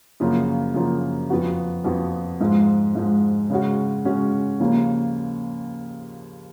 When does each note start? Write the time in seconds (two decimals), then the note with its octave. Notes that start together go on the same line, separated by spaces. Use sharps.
0.20 F#2 C#3 F3 A#3 F4
0.75 F#2 C#3 F3 A#3 F4
1.30 F2 F3 B3 F#4
1.85 F2 F3 B3 F#4
2.40 G#2 F3 G#3
2.95 G#2 F3 G#3
3.50 C#3 G#3 C#4 F#4
4.05 C#3 G#3 C#4 F#4
4.60 D#2 C#3 F3 A#3